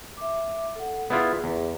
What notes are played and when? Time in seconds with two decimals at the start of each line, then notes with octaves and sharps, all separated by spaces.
0.17 E5 D6
0.76 A4 F#5
1.10 B3 E4 F4 G#4 D5
1.44 E2